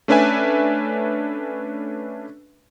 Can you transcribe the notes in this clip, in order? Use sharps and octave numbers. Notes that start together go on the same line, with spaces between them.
A3 C#4 D4 B4 E5 G#5